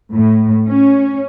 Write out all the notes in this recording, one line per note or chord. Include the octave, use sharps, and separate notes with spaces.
A2
C#4